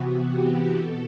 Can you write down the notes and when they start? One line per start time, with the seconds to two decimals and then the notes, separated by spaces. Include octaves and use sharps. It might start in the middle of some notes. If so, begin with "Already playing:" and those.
Already playing: C3 E3 B3 F#4
0.27 G4
0.77 B2 A4